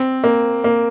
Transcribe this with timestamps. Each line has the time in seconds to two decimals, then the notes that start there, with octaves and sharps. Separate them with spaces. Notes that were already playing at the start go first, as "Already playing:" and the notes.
Already playing: C4
0.24 A#3
0.64 A#3